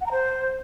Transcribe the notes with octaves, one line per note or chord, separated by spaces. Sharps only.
F#5
A#5
C5